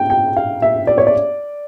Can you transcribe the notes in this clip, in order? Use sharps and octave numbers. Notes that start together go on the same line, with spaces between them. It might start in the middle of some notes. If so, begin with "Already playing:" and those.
Already playing: G5
G5
F5
E5
D5
C#5
D5